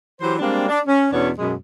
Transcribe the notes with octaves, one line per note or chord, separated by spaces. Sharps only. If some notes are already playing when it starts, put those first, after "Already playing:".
E3 F#3 G4 C5
G3 G#3 A#3 C4 D4
D4
C#4
E2 B2 B3 C#4 D4 C#5
F#2 B2 G#3